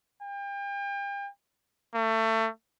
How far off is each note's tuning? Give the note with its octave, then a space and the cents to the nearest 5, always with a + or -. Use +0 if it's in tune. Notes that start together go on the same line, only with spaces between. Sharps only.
G5 +35
A3 +25